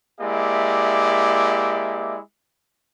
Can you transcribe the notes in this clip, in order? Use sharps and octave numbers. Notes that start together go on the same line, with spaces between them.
G#3 A#3 E4 G4 D5 E5